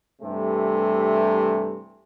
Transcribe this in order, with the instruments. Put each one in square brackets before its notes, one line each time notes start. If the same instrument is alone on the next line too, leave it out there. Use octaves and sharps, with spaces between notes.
[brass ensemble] G2 C3 E3 A3